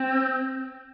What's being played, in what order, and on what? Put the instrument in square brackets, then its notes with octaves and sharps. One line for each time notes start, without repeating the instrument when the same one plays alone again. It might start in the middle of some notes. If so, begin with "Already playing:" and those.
Already playing: [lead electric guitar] C4